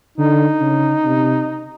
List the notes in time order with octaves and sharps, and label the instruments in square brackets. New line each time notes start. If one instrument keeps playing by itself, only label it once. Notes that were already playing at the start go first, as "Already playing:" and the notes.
[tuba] D3 [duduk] D#4
[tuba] C#3
C3